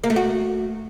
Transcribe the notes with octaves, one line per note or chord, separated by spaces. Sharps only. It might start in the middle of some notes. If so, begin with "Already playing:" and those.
A#3
A3
F#4